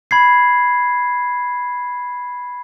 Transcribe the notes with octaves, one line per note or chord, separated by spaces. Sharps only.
B5 G#6 C7